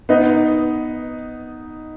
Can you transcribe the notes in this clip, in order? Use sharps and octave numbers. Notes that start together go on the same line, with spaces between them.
B3 D#4